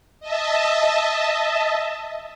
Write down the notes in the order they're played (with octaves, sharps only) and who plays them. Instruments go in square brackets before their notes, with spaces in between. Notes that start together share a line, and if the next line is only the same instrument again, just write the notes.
[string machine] D#5 E5 A5